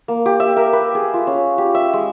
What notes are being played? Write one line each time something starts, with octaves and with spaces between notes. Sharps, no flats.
A#3
G4
E5
A#4
B4
G#4
F4
C#4
G4
E5
G#3